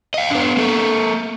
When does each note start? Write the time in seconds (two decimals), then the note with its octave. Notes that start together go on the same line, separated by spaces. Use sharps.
0.14 D#5 F5
0.30 B3 D4
0.57 A#3 A4